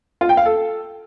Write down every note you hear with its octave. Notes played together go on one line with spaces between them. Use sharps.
F4
G5
F5
A4